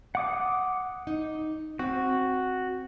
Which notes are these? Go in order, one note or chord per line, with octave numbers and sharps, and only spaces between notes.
F#5 D6 D#6
D#4
C4 F#4